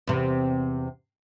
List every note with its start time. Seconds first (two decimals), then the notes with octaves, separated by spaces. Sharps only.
0.07 E2 C3